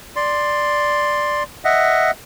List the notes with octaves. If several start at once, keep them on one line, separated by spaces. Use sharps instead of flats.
D5 C6
D#5 E5 F#5